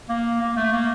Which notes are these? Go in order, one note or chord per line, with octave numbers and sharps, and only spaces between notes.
A#3
A#3
A3
A#3